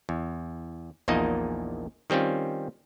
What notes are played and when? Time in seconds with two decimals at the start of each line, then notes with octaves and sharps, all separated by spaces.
0.09 E2
1.08 A#1 E2 A#2 A#3 D#4 D#5
2.10 D#3 G3 C4 C#4 F4